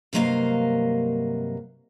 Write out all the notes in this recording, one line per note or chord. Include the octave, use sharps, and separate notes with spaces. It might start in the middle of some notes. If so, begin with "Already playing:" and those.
G2 C3 F#3 A#3 D#5 F5